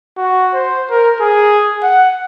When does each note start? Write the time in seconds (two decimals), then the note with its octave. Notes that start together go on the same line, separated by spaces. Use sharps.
0.17 F#4
0.53 C5
0.90 A#4
1.20 G#4
1.83 F#5